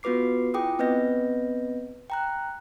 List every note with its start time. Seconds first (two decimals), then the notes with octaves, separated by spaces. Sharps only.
0.03 B3 F4 F#4 B4 D6 C7
0.54 E4 F4 G#4 G5 D6 D#6
0.79 B3 C4 B4 D#5 G6 A#6
2.10 G5 A#5 F#6